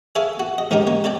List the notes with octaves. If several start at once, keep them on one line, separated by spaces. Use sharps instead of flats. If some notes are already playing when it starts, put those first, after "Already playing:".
G#4 A4 C#5 E5 F5
F#4
D#5
G#2 D#3 C#4 D#4 G4
A#3 C#5
A4 C#5 D5 G5